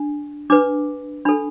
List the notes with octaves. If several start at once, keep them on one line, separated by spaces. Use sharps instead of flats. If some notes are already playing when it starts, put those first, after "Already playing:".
Already playing: D4
D4 B4 D6
D4 A4 B5